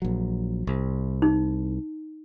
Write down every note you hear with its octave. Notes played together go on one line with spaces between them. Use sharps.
A#1 F#3
C2
D#4